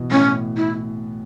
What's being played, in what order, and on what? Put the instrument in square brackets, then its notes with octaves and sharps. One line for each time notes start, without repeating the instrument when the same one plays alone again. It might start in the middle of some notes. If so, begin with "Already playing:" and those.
Already playing: [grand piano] B2 E3
[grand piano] A2 [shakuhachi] C#4
[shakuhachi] E4